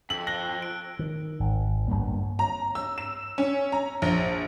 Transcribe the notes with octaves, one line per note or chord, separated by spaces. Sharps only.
F2 E6 F#7
F#6 A#6 G7
D7
D#3
G#1
G1 E2 G2 A#3
A#5
E6
E7
C#4
A#5
A#1